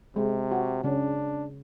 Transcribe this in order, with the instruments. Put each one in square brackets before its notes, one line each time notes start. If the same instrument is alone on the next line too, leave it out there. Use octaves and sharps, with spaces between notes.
[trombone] C3 [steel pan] G#3
[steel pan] F#4
[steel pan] C#3 C#4 [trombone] D4